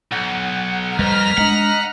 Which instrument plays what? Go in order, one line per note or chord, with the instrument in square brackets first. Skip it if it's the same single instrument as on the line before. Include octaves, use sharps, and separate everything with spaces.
[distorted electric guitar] B1 [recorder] F#5
[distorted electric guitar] F2 [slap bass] G3 [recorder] B4 [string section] A#5 F6 B6
[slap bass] G#3 D4 [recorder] D#5 [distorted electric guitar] F#5